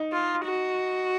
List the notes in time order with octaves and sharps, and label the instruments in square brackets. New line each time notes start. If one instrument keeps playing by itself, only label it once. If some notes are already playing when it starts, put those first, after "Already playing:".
Already playing: [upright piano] D#4
[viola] F4
F#4